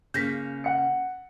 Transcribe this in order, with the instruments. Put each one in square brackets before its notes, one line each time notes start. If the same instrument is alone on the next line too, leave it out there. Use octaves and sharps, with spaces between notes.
[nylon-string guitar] C#3 A#3 [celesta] G6 A#6 B6
[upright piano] F#5 C#7